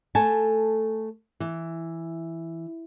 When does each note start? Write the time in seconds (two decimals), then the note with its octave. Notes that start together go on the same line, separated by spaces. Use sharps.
0.15 A3 A4 G#5 A5
1.40 E3